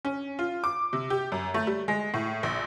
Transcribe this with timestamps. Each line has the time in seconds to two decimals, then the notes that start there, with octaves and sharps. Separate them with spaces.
0.05 C#4
0.39 F4
0.64 D6
0.93 C3
1.10 G4
1.32 F#2
1.54 A3
1.67 G3
1.88 G#3
2.14 A2
2.43 A#1